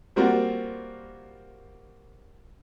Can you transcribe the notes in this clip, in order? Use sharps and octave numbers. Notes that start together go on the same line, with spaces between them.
G3 A#3 C4 F4 F#4